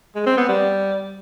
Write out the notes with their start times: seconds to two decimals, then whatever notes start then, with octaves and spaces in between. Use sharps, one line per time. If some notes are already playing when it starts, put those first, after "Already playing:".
0.15 G#3
0.26 C4
0.37 B3
0.48 G3